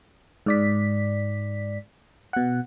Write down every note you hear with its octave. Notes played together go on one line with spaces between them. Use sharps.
G#2 D5 B6
B2 F#5